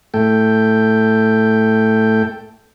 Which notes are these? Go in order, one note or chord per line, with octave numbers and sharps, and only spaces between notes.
A2 A3 A4 G5